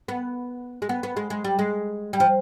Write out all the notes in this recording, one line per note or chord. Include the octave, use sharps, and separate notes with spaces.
B3
G#3
B3
B3
G#3
G#3
G3
G#3
G3
F3